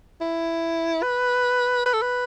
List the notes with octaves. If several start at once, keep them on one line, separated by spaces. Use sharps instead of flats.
E4
B4
B4
A4
B4